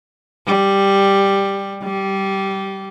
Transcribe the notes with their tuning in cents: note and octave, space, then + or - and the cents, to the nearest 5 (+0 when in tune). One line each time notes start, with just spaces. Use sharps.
G3 +5
G3 -15